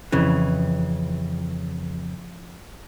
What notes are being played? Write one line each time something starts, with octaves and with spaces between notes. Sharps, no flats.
F2 C#3 E3